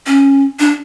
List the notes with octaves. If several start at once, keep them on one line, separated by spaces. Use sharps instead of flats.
C#4
D4